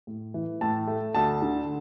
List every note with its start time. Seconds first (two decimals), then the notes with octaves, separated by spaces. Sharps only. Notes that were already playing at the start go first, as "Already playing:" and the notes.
0.07 A2
0.34 E3
0.61 A2 A5
0.87 A3
1.15 D2 A5
1.42 D3